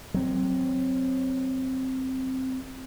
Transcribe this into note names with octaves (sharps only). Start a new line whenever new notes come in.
F#3 C4